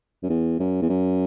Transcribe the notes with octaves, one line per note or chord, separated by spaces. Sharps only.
F#2
E2
F#2
E2
F#2